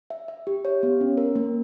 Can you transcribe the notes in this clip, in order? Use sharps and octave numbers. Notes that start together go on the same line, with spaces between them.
E5
E5
G4
C#5
B3
C#4
A#4
A#3